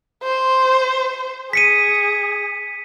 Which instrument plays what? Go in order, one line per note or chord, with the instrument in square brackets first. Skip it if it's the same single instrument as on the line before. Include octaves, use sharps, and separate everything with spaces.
[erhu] C5
[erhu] G#4 [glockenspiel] B6 C#7 D#7